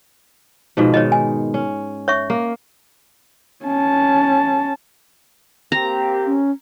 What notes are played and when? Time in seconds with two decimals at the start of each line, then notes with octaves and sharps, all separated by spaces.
0.77 G#2 B2 F3
0.94 D#3 C#5 D#5
1.12 G#5
1.54 C#4
2.08 C#5 E5 C#6
2.30 A#3
3.65 C#4 A5
5.72 A#3 C4 G4 A#5
6.26 C#4